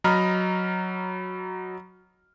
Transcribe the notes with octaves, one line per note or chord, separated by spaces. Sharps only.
F#3 D#5 A#5 B5 F6